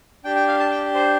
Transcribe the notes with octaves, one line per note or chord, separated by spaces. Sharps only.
D4 G4 G5
G5
F5
A5
G5
C5